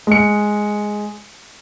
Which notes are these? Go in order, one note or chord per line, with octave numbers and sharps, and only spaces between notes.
G#3 C#7